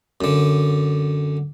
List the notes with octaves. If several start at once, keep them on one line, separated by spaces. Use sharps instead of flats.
F#2 D3